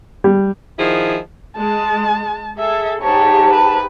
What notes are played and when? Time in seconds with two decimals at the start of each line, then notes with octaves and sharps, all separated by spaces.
0.24 G3
0.79 D#3 F3 E4 G#4
1.58 G#3 A5
2.58 G#4 A4 E5
3.03 G#2 G4 C#5 A5
3.52 B4